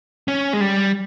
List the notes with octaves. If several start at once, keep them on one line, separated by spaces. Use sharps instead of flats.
C#4
G#3
G3